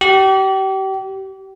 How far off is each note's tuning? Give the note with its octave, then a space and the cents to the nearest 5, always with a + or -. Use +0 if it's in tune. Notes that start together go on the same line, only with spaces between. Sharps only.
G4 -35